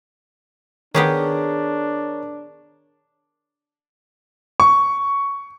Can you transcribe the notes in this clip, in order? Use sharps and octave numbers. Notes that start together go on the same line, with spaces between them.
D#3 B3 D4 G4 G#4 A#4 C#5
C#6